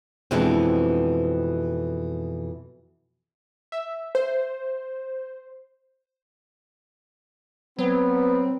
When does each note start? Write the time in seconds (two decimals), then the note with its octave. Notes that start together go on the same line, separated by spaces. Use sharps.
0.31 F2 B2 E3 G#3 C4 D4
3.72 E5
4.15 C5
7.79 F#3 B3 C4